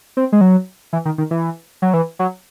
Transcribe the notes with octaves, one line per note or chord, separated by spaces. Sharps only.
C4
G#3
F#3
E3
D#3
D#3
E3
F#3
E3
F#3